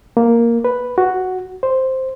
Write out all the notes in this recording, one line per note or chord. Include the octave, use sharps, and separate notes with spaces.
A#3
B4
F#4
C5